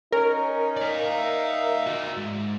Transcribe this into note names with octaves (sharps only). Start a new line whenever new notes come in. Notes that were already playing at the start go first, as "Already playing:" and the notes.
C#4 D#4 A#4
D5 F5
E5
F#4 D5
G#2